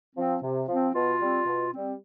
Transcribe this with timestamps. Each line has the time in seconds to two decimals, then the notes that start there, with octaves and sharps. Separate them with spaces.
0.15 F3 C4
0.41 C3
0.67 F3 C4
0.94 B2 F4
1.19 G3 C4
1.46 B2
1.72 G3 C4